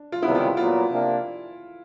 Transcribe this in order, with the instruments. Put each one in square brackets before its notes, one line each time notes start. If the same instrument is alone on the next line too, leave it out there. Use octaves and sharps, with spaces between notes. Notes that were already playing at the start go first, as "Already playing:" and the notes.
Already playing: [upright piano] D4
F4
[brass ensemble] C#2 C3 D#3 G3 B3 [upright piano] E4
[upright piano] F4
E4
[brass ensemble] A#2 F#3 B3 [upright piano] F4
[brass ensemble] C3 A#3 D4